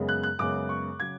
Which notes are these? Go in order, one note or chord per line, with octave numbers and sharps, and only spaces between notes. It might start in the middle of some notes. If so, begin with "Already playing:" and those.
Already playing: F#2 C#3 G#3 B3
F#6
F#6
F#2 C#3 G#3 B3 D6
C#6
C#3 F#3 G#6